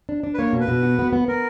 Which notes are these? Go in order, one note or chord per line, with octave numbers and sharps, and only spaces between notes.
D4
D4
B4
A#3 C#5
B2
B4
B2
F#4
B3
B3
B3 A#4